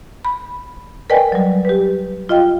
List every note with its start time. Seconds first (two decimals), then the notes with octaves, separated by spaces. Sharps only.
0.25 B5
1.10 A#4 B4 D5 D#5 G5 G#5
1.32 F#3 G3
1.65 G4 B4
2.29 F4 D#5 F5 G5